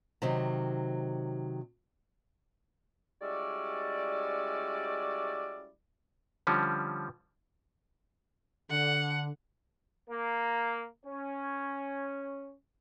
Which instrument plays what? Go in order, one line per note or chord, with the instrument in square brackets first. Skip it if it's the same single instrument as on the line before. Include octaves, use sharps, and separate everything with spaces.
[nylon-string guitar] C3 D#3 F#3 C4 D#4
[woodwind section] G3 G#3 C#4 E4 F#4 D5
[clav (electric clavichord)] D3 F3 G3 C#4
[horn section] D3 [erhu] F#5
[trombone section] A#3
C#4